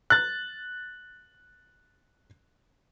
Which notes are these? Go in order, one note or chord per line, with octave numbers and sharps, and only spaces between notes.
F#6 A6